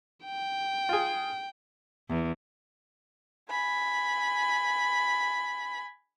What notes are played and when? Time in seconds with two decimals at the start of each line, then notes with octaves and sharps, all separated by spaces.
0.25 G5
0.89 F4 G#4
2.09 E2
3.50 G#5 B5